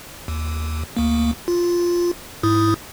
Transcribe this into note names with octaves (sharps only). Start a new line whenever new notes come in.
D#2
D2 A#3
F4
G#2 E4 D#6